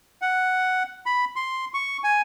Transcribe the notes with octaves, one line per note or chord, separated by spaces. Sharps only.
F#5
B5
C6
C#6
G#5